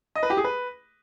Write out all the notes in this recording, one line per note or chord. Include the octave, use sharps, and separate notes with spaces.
D#5
B4
G4
G#4
B4